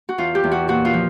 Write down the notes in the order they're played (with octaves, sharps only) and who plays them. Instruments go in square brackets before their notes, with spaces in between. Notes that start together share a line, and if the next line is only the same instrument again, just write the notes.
[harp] F#4
E2 F4
G4
E2
F#4
A#2 F#4
F4
F3